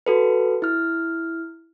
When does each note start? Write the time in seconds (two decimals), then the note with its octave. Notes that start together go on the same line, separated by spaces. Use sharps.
0.06 F#4 A4 B4
0.62 E4 F6